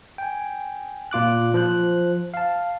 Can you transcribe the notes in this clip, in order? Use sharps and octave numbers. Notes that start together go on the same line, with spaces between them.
G5 G#5
A#2 F4 D6 F#6
F3 C5 F#6
F5 A5